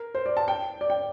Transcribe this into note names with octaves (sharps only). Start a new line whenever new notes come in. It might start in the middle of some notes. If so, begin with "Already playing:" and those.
Already playing: A#4
C5
D5
A5
G5
D5
G5